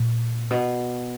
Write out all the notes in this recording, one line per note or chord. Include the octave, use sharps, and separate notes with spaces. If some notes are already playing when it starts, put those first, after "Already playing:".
Already playing: A#2
B2